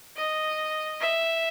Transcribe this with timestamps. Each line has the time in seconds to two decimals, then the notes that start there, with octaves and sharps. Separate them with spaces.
0.16 D#5
1.01 E5